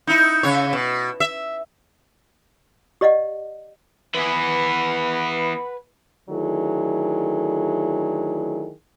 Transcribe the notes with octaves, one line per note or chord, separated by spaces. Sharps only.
D#4 E4
C#3 C#5
B2
E5
G4 D5 D#5 F5 F#5
E3 B3 B4 F#5 G#5 B5
D3 D#3 F#3 A3 E4 G#4